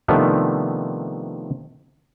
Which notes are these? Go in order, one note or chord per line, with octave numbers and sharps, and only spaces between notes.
C3 D#3 F3 A3 B3 D4